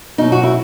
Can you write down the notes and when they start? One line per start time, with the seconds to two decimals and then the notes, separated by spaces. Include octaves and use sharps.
0.18 B2 F#3 D#4
0.32 F#4
0.43 E4